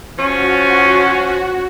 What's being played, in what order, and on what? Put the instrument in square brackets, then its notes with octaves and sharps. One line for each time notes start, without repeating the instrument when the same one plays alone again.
[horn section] F3 C#4 [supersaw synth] F#4